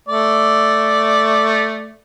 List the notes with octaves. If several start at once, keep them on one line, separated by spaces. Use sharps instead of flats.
A3 D5